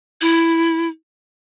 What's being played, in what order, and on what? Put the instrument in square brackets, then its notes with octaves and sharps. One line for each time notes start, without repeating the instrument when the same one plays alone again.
[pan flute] E4